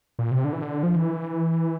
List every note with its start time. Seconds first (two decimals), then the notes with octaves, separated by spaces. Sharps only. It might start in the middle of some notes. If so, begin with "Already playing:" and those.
0.19 A#2
0.31 C3
0.44 D3
0.53 E3
0.62 D3
0.83 F3
0.96 E3